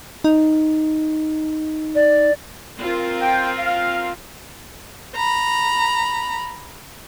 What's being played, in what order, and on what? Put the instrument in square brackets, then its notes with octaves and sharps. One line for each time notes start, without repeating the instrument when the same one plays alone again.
[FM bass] D#4
[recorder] D5
[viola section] C4 F4 A#4
[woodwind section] G5
F5
[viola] A#5 B5